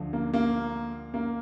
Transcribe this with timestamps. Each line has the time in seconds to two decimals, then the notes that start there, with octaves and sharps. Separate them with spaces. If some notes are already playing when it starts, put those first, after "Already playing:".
Already playing: D2 D3 F3
0.13 A#3
0.33 A#3
1.14 A#3